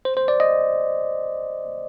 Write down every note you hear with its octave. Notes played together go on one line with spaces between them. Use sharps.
C5
C5
D5
D#5